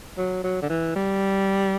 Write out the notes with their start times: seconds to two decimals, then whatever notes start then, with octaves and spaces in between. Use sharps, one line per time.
0.17 F#3
0.44 F#3
0.62 D3
0.70 E3
0.96 G3